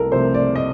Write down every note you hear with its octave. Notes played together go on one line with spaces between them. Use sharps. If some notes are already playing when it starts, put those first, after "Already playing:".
Already playing: C2 A4 A#4
C3 F3 A3 C5
D5
D#5